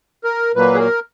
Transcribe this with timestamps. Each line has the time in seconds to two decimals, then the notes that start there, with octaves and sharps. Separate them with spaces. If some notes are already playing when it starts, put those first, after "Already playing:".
0.24 A#4
0.55 A#2 F#3 A#3 B4
0.74 G#4
0.79 A#4